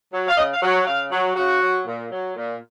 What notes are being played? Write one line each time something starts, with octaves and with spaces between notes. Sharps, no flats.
F#3
F5
C#3 D#5
F5
F#3
F#5
C#3 F5
F#3
C#3 F#4
F#3
A#2
F#3
A#2